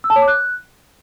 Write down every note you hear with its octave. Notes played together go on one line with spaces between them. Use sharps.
E6
A5
C#5
D6
F#6